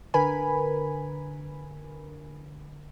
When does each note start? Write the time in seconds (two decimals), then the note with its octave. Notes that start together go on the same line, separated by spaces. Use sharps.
0.14 D3 A#4 B4 G#5 B5